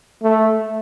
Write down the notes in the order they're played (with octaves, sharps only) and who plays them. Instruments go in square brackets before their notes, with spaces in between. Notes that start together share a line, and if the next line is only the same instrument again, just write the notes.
[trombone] A3